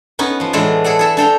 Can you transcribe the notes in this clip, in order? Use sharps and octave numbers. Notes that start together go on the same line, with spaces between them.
B3 C#4 D#4 B4
F3 B3
A2 E3 G#3 D4 A4 D5
G#4 A4 D5 F#5
G#4 A4 E5
D4 A4 G5 A#5